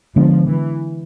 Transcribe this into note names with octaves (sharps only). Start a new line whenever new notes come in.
D3 F3 G#3 B3 D4
E3